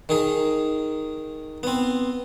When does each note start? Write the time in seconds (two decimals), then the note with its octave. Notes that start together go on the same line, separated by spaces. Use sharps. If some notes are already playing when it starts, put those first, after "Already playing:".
0.09 D#3 D#4 G#4
1.63 B3 C4